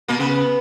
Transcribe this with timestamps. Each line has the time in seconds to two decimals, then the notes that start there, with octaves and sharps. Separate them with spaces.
0.09 B2 A#3
0.19 C#3 B3